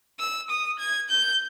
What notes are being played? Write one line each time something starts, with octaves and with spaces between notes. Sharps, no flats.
E6
D#6
G#6
G6